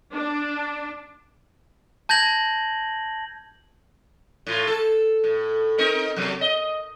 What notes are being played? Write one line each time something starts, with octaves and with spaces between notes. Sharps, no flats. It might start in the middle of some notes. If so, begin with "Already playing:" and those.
D4
A5 G6 G#6 A#6 F#7
A2 F4
A4
A2
C4 D#4 A#4
B2 F#3
D#5